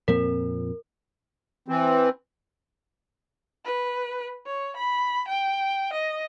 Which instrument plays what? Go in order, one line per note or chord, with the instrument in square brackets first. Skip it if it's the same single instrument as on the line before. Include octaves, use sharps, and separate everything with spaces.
[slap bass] F2 A#2 C4 [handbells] A#4
[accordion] E3 C4
[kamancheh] B4
C#5
B5
G5
D#5